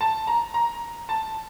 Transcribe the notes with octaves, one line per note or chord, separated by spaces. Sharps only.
A5
A#5
A#5
A5